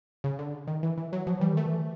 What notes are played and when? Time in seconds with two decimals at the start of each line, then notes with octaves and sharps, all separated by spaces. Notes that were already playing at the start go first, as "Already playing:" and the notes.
0.24 C#3
0.39 D3
0.67 D#3
0.83 E3
0.98 E3
1.13 F#3
1.27 F3 F#3
1.40 E3 G3
1.53 D#3 A3
1.66 E3